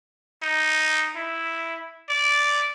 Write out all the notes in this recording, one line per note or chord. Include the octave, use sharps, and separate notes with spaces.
D#4
E4
D5